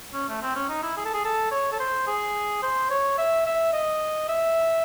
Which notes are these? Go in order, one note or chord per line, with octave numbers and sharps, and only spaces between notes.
C#4
A3
C4
C#4
D#4
E4
G#4
A4
G#4
A4
C#5
A4
C5
G#4
C5
C#5
E5
E5
D#5
E5